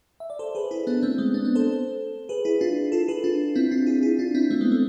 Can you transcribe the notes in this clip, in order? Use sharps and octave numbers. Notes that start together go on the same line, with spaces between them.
E5
D5
A4 C5
G#4 B4
E4 G#4
B3 D4
A3 C4
G#3 B3
B3 D4
B3 D4
A4 C5
G#4 B4
E4 G#4
D4 F4
F4 A4
G#4 B4
D4 F4
C4 E4
D4 F4
E4 G#4
E4 G#4
D4 F4
C4 E4
A3 C4
G#3 B3
A3